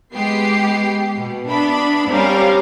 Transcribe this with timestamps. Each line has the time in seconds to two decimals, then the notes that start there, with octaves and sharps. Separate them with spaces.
0.14 G#3 B3 G4 C7
1.16 B2
1.48 B3 D4 E5 B5
2.09 G3 C4 C#4 A#4 F5